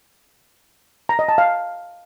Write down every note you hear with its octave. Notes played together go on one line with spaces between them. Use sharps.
A#5
D#5
A5
F5